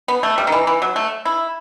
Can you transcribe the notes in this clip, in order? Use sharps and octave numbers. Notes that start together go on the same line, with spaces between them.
B3
A3
G3
D#3
E3
E3
F#3
A3
E4